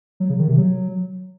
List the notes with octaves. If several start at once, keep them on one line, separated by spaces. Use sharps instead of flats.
F#3
C#3
D#3
C3
F#3